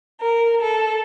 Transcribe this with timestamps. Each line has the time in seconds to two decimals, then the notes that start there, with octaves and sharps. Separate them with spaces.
0.21 A#4
0.61 A4